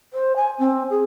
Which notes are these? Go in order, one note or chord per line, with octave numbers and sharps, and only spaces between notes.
C5
G#5
C4
G#4